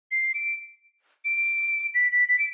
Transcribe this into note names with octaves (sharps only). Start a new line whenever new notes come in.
C7
D7
D7
B6
B6
B6
D7